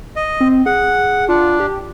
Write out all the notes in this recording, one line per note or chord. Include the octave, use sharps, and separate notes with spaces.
D#5
C4
G#4 F#5
D4 F4
G4